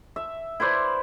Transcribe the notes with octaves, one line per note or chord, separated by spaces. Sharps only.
E5
E4 B4 C5 D5